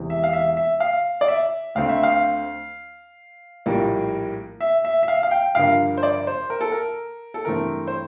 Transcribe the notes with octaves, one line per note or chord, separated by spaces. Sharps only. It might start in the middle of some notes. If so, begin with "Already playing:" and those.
Already playing: E1 E2 C3
E5
F5
E5
E5
F5
D5
E5
D2 D3 A3 C4 F5
E5
F5
A#1 A2 G3 A#3
E5
E5
E5
F5
F5
G5
G2 D3 F3 A#3 F5
C5
D5
C5
A#4
A4
A#4
A4
G2 E3 A3 C4 A#4
C5